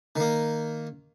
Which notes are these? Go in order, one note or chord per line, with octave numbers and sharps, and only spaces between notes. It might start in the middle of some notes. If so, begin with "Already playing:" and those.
D#3 A#3